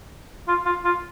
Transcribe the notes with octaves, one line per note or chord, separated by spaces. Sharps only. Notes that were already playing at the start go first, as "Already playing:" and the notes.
F4
F4
F4